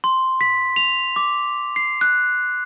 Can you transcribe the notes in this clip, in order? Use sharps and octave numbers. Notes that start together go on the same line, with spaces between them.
C6
B6
F7
D6
C7
F#6